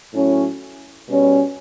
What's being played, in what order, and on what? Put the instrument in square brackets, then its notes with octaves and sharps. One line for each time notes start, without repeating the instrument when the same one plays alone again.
[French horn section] A2 F#3 C#4
B2 G3 C#4